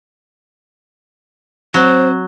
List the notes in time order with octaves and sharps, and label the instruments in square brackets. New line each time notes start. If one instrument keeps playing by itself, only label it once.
[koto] F#3 [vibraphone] C4 [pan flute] C5